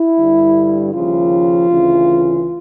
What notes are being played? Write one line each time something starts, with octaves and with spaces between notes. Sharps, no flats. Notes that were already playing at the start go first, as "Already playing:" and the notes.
Already playing: E4
G2 D3 G3
D#2 C#3 F3 F4
D2 C#3 E3